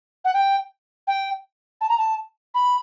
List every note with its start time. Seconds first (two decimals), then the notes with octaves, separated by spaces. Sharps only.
0.25 F#5
0.34 G5
1.07 G5
1.81 A5
1.89 A#5
1.98 A5
2.54 B5